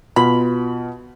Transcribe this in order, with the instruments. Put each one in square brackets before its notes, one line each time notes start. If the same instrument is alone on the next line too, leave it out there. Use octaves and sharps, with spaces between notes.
[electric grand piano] B2 F4 [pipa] B5